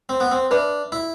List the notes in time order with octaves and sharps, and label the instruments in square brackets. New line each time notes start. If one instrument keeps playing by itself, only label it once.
[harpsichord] C4
B3
C4
[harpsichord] D4 [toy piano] B4 E5 B5
[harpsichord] E4